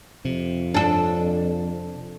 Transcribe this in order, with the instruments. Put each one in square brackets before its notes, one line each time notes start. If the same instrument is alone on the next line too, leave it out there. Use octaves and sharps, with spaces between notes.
[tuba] F2 [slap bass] C3
[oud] D4 A4